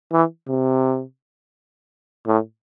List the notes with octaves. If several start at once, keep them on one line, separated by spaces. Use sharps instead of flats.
E3
C3
A2